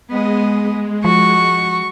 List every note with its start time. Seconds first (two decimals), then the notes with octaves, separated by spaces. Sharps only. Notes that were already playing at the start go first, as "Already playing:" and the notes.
0.10 G#3 B3 D#5
1.04 F3 F#4 C#6